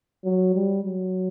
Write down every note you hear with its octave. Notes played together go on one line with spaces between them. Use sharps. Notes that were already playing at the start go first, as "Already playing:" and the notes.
F#3
G3
F#3